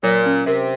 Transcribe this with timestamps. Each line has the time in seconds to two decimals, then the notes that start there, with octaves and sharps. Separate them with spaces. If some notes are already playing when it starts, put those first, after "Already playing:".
0.03 A#2 F#3
0.26 C#4
0.46 C3 A#4